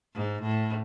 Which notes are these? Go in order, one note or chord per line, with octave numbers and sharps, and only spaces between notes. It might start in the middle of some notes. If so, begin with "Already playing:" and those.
G#2
A2